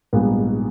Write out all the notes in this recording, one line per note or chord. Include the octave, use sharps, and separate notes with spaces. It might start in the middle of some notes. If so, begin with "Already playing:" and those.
A#1 G#2 G3 B3 D#4